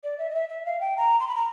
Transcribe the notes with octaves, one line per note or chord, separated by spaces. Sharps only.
D5
E5
D#5
E5
E5
F5
G5
A#5
C6
B5
A#5